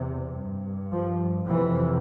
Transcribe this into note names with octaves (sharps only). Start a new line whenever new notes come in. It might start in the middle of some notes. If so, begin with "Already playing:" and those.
Already playing: E2 C3
G2
F3
F2 C3 E3